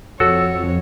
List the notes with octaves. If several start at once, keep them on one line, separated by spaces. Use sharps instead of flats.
F2 F#4 A4 C#5 E6